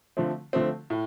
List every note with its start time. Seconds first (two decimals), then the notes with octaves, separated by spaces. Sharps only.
0.17 D3 F3 A3 C4
0.53 D3 F3 A3 C4
0.90 A2